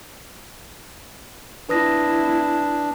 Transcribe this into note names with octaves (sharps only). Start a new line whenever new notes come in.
D4 E4 B4 D#6 A#6